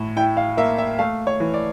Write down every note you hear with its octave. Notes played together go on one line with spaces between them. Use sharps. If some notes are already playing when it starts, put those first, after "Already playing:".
Already playing: A2
E4 G5
F5
A#3 E5
E5
A3 F5
C#5
E3
D5